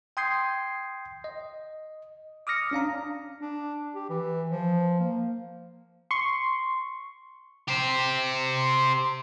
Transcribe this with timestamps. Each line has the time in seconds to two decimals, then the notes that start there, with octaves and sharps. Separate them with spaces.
0.17 G5 C6 D#6 G6 G#6 C7
1.24 D#5
2.47 D6 D#6 F6 A#6 C#7
2.71 C#4 D4 F5 A#5
3.42 D4
3.95 G4
4.10 E3
4.50 F3
5.00 A#3
6.11 C6 C#6
7.68 G4 C5